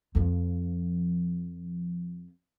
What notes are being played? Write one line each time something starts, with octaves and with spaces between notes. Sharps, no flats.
F2 F3